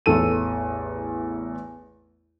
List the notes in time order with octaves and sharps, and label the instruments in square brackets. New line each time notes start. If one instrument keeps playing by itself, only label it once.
[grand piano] A1 E2 A4 D#7